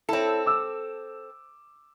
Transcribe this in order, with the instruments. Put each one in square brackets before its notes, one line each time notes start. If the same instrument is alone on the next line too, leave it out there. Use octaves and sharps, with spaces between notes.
[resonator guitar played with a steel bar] C4 A4 [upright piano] E4 C#5
[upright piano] D6 E6